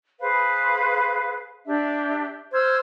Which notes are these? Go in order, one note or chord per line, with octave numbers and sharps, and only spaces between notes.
G#4 B4 C5 F5
D4 G4 E5
C5 E6 F6 G#6